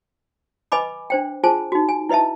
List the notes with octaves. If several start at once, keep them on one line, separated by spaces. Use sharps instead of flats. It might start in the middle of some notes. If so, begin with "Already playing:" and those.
B4 D#5 G#5 B5 D6
D4 C5 G5
F4 G#4 C5 G#5 A5
D#4 F#4
G#5
E4 B4 D#5 E5 A5